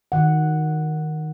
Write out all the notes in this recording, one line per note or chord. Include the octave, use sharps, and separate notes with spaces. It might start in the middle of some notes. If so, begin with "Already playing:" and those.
D#3 F#5